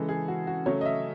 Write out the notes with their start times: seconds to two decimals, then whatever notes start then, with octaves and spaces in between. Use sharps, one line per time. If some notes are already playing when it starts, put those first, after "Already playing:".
Already playing: C#3 E3 G#3 A4
0.09 G#4
0.28 F#4
0.47 F#4
0.66 C#3 F#3 A3 C#5
0.81 D#5
0.86 E5